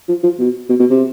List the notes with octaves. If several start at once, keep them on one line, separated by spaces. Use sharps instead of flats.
F3
F3
B2
B2
B2
C3